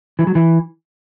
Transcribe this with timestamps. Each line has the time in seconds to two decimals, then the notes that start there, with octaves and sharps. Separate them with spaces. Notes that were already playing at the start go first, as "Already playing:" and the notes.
0.19 E3
0.27 F#3
0.35 E3